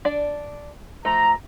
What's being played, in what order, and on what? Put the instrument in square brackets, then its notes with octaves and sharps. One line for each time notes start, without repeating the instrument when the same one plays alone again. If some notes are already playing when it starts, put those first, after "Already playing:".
[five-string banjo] D4 D5
[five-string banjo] F3 A3 [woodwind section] A#5